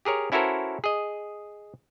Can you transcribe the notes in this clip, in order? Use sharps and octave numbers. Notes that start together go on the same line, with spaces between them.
G4 G#4 A#4 C#5
C#4 E4 F#4 A4 A#4 C5
G#4 D#5